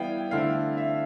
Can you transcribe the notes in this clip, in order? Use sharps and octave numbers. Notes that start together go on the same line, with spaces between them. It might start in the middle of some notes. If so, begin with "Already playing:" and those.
Already playing: E3 G3 B3 E4 F5 G5
D3 A3 C4 E4 F5
E5